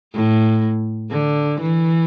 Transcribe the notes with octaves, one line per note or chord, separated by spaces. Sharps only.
A2
D3
E3